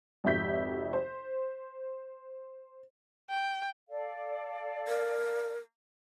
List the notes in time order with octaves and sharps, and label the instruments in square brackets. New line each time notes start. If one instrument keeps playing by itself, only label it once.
[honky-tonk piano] G#1 F2 C3 E5 G6 B6
C5
[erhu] G5
[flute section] A4 D5 F5
[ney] A#4